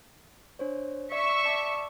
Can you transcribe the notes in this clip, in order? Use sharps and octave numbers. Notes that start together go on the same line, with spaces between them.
D4 C5 C#5
D5 E5 C#6
D5 A5 D6